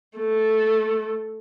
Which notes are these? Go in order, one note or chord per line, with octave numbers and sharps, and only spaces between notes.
A3